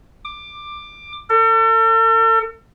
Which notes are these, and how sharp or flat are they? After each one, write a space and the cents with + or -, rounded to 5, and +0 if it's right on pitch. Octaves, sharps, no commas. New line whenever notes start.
D6 +15
A4 +40